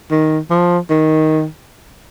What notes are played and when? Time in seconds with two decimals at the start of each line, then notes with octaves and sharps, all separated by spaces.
0.11 D#3
0.50 F3
0.90 D#3